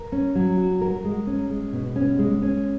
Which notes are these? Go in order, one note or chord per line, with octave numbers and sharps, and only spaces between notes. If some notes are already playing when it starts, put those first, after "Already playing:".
Already playing: A#4
C#4
F#3
F#4
A#4
G#3
C#4
G#3
B2
C#4
G#3
C#4